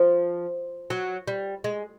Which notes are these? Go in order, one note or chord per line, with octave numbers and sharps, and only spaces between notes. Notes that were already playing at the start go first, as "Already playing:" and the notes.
Already playing: F3
F#3
G3
G#3